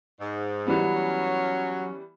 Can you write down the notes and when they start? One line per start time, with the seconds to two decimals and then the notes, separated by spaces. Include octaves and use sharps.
0.20 G#2
0.67 E3 F#3 G3 B3
0.96 C#4